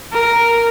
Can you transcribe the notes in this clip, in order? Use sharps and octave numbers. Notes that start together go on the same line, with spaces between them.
A#4